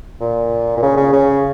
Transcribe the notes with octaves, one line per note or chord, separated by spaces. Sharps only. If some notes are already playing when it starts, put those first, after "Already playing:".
A#2
A#2
C#3
C#3
C#3